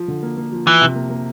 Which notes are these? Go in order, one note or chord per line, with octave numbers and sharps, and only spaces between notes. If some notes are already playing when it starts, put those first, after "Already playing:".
Already playing: F3
D3
A#3
A#3
F3
E3 F3
C3
A#3
A#3